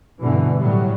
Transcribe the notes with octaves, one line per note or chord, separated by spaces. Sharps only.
G2 B2 D3 E3
A2 F#3 G3